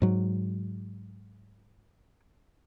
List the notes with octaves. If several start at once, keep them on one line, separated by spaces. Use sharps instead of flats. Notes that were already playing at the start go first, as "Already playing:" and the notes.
G#2 F#3